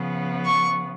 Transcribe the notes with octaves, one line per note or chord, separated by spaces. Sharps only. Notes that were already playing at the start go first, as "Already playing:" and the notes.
Already playing: C#3 F3 B3
C#6